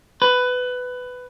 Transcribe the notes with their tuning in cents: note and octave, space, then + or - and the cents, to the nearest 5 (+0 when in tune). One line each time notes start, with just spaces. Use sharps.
B4 +15